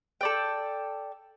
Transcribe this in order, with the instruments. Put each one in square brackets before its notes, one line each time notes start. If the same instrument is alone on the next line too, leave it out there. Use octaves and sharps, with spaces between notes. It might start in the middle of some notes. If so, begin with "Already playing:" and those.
[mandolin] A4 D5 G5